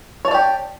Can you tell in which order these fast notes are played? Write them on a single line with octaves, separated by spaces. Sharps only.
C#5 A5 D5 G4